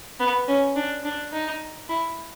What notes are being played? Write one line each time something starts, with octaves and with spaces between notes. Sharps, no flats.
B3
C#4
D4
D4
D#4
E4